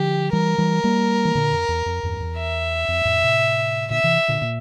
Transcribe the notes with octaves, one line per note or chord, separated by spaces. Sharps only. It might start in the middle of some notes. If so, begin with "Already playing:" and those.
Already playing: D3 F3 G4
E3 G3 A#4
E3 G3
G3 A#3
E3
A#2 D3
F2
E2
F2
E2 G2
E2
E5
F2
F2 A2
A2 C3
A#2 D3 E5
C3 E3
A#2 D3
A#2